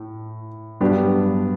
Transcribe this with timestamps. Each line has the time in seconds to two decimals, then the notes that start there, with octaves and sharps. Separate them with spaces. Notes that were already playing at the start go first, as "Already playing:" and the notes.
Already playing: A2
0.80 G2 F#3 B3 D4 G4